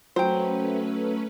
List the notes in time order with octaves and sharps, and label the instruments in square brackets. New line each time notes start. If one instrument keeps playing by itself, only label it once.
[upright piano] F#3 [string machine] A3 C#4 B4 [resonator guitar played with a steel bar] C5 G5